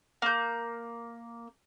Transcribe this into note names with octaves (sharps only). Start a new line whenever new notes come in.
A#3 G6